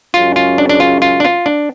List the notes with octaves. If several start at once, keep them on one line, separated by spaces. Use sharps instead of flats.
F#2 C#3 G#3 C#4 F4
F4
D4
D4
F4
F4
D4
F4
D4